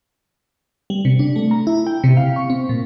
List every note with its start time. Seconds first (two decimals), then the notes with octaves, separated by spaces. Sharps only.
0.90 G3
1.05 C3
1.19 D4
1.36 A3
1.51 A#5
1.67 E4
1.87 G5
2.04 C3
2.17 F5
2.36 C#6
2.50 C4
2.69 A#2